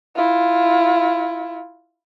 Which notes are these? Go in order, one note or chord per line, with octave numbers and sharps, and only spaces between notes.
E4 F4